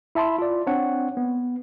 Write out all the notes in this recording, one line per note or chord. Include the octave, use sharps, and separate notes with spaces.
E4 E5 A5 B5 C6
F4 D5
C4 D4 C#5 F#5
B3